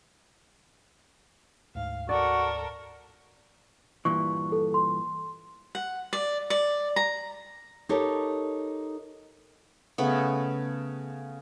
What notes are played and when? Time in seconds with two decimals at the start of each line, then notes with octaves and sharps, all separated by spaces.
1.75 D2 G#2 F5
2.09 F#4 A4 A#4 D5
4.05 G2 A#2 E3 C#6
4.52 A4
4.74 C6
5.75 F#5
6.13 D5
6.50 D5
6.96 A#5
7.89 D#4 G4 A4 A#4 C#5
9.98 C#3 A3 B3